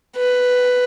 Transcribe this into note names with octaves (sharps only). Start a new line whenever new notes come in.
B4